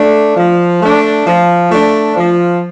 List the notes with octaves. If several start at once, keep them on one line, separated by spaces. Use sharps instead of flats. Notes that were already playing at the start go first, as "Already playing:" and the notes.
Already playing: A3 D4
F3
A3 D4
F3
A3 D4
F3